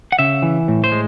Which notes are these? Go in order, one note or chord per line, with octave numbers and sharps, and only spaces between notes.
F#5
C#3 E5
E3
A2
C5
G#3